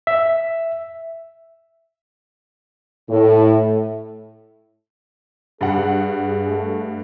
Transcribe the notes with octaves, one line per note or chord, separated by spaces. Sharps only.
E5
A2
G2 G#4 F#5
A3